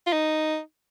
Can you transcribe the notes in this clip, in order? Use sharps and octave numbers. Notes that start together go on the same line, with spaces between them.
F4
D#4